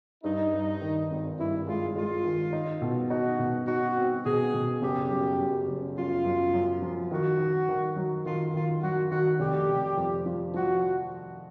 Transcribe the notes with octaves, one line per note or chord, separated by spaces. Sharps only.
G2 D#4
G2
D#3
G#1
G2 E4
G#3 F4
G#3 F4
D#3
D#4
B2
D#4 F#4
B2
D#4 F#4
C4
B2 G#4
B2
F#1 G4
F#2
F#2
F#1
F#2 F4
F#2
F#2
F3
D#3 F#4
D#3
D#3
F#3
D#3 F4
D#3 F4
F#3 F#4
D#3 F#4
F1 G4
F1
F2
F3
F3 F#4